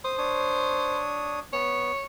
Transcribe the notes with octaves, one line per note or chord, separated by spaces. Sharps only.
C5 D#6
D4 C#5 D#6
B3 C#5